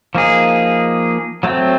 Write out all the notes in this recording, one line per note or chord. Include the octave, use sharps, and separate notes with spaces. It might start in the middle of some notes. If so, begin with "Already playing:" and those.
F3 A#3 D#4 G#4
F#3 A3 C4